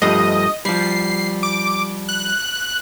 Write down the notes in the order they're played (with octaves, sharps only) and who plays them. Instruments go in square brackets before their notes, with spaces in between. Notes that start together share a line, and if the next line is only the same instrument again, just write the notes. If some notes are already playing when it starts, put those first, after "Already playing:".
[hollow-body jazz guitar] G2 F3 A3 [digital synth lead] D#5
[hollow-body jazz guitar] F3 G3 [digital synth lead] C7
[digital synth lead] D6
F#6